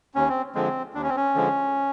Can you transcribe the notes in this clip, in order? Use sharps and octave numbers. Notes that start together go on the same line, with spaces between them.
D#2 C#4
C4
D3 F3 G#3 C4
D#2 D4
C#4
C4
C#4
D3 F3 G#3